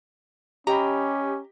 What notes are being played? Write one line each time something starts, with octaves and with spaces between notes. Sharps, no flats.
C#4 G4 D#5 G5 A#5 B5